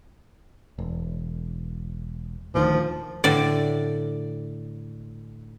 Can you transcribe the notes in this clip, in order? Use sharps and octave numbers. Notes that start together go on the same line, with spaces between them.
E1
D#1 D2 D#3 F3
A2 D3 D5